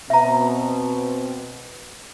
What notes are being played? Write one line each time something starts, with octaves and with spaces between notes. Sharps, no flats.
B2 C4 E5 A#5